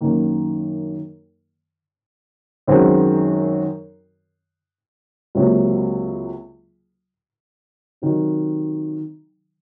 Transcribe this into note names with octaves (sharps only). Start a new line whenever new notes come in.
F#2 D#3 A#3
F#2 D#3 G#3 C4 F#4
C#2 C3 F#3 A#3
C3 D#3 F#3